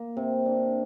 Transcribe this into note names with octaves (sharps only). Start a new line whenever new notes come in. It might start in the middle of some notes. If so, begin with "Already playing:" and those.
Already playing: A#3
C3
D4